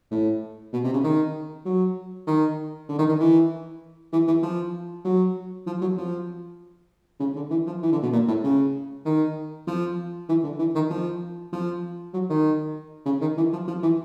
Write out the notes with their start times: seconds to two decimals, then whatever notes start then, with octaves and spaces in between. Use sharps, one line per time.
0.11 A2
0.73 B2
0.84 C3
0.94 C#3
1.04 D#3
1.65 F#3
2.27 D#3
2.89 D3
2.99 D#3
3.09 D#3
3.20 E3
4.13 E3
4.27 E3
4.43 F3
5.05 F#3
5.67 F3
5.81 F#3
5.98 F3
7.20 C#3
7.36 D3
7.51 E3
7.66 F3
7.83 E3
7.92 D3
8.02 B2
8.13 A#2
8.28 A2
8.43 C#3
9.05 D#3
9.67 F3
10.29 E3
10.43 D3
10.59 E3
10.75 D#3
10.90 F3
11.53 F3
12.13 F#3
12.29 D#3
13.05 C#3
13.21 D#3
13.37 E3
13.53 F3
13.68 F3
13.83 E3